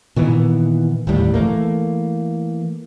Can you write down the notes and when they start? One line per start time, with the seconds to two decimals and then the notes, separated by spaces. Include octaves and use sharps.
0.16 A#2 D#3 E3 B3
1.07 G1 D#2 A2 G3
1.34 E3 F#3 A3 A#3